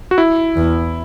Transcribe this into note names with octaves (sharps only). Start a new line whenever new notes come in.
F#4
E4
E2